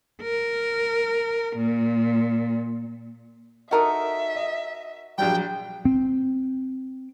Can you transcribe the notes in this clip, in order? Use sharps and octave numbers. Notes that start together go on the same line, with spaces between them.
A#4
A#2
D#4 F#4 A4 A#4 D#5 E5 D#6
D#5
A#1 F#3 G3 G5
C4